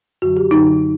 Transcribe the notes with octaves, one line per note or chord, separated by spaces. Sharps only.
F#2 D3 F#3 F#4
G4
F#2 D3 F#3 D#4